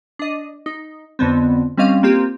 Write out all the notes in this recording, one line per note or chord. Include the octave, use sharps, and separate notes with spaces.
D4 D#5
D#4
F2 D3 B3 C4
G3 C4 C#4 D#5 F5
A#3 C4 F4 G4